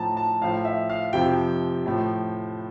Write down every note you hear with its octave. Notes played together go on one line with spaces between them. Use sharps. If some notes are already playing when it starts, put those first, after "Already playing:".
Already playing: A2 F3 A5 A#5
A5
A2 F3 F5
E5
F5
F2 C3 F3 G5
A2 F3